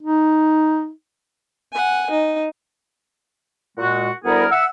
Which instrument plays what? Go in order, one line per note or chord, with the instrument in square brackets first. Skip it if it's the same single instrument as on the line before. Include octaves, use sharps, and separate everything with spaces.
[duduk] D#4
[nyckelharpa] F#5 G#5
D#4
[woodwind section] A#2 G#3 F#4
D2 G3 B3 E4 G#4 A#4
E5 F#5 E6